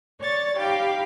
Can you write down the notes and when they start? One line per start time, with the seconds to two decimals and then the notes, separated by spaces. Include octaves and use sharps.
0.19 C#5 D5 C#6 A6
0.57 D#4 G4 F5 G5 B5